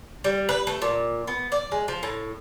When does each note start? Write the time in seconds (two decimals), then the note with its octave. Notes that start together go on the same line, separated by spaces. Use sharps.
0.24 G3
0.49 B4
0.67 A3
0.82 A#2
1.28 B3
1.52 D5
1.72 G#3
1.88 F3
2.03 A2